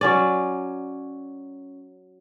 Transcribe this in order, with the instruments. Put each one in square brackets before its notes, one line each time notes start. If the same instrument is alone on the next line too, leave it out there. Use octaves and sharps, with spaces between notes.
[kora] F#3 C#4 D5